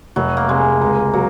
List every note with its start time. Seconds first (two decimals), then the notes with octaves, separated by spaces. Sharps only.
0.16 F1 F#3
0.37 A#3
0.48 C3 G#3
0.80 C#2 A#3
1.13 F#3 A#3